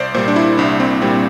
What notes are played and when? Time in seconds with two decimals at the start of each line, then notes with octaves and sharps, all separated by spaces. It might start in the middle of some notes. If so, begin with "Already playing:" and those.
Already playing: C2 C5 D5
0.14 A#2 C5
0.17 G3
0.28 D4
0.36 E4
0.57 C2 D4
0.80 C4
1.02 A#2 G3 C4